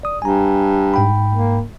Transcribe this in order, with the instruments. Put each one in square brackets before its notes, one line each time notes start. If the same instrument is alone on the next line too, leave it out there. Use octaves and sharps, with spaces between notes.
[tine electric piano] D5 D#6
[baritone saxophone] G2 [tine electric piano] G#5 A#5
[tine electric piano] G#2 G5 B5
[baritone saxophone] A#3